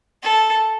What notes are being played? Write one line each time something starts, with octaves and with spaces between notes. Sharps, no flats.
A4